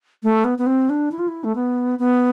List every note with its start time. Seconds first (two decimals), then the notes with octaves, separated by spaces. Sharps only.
0.23 A3
0.44 B3
0.58 B3
0.66 C4
0.90 D4
1.12 E4
1.19 F4
1.28 E4
1.44 A3
1.55 B3
1.99 B3